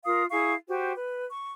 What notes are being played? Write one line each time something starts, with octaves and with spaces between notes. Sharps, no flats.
F4 A#4 F5 D#6
E4 G#4 F5 C#6
F#4 G4 C5
B4
C#6